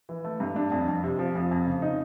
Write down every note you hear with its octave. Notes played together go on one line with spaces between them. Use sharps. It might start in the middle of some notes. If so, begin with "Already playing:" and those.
E3
A3
G2
D4
F2
F2
C3
F3
F2
F2
C#3
D#4